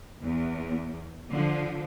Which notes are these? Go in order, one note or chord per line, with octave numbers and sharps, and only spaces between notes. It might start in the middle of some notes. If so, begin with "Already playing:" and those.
E2
D3 F3